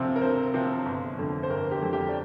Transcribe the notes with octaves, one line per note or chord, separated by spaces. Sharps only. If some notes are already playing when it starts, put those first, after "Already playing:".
Already playing: D2 C3 F3 C4
A#4
D2 C5
C3 F3 C4
G1
F2 D3
C5
G1 A#4
G4
F2 D3
G4
D5